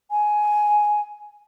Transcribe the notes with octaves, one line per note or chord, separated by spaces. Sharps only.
G#5